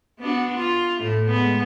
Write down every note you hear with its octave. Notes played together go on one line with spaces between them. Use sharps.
B3 D4 F#4
F4
A2 A3
G#3 B3